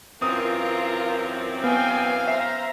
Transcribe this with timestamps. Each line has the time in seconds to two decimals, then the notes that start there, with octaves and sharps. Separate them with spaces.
0.22 F#2 E3 C4 F4 A#4 D#6
1.64 B3 F5 G5 G#5
2.28 C5 E5 A#5